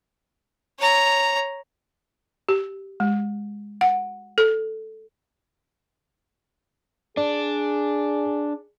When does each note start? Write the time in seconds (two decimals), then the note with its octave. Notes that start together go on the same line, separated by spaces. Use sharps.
0.79 C#5 A#5
2.49 G4
3.00 G#3
3.81 F#5
4.38 A4
7.17 D4 G#4 D5